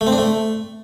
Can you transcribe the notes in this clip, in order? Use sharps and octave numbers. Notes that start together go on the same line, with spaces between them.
A3
C4
D4
A3